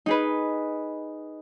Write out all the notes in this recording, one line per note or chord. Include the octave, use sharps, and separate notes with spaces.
D#4 G#4 B4